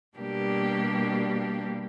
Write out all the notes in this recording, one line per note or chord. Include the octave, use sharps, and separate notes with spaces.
B2 G3 A#3 D4 G4